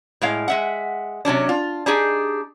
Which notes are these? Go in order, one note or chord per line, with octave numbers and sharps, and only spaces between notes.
A2 G#3 F5
G#3 E5 F#5
C3 F#3 C#4 D4
F4
D4 D#4 G4 G#4